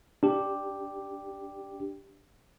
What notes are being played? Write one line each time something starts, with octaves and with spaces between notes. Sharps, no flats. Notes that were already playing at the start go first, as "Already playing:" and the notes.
D4 G4